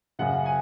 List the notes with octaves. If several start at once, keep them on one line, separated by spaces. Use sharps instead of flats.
F#2 C#3 F#5
G#5